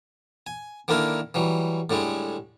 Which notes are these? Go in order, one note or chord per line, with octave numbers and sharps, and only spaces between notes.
G#5
D3 D#3 A#3 D4 E4 A#4
E3 F#3 G3
A2 D3 G3 G#3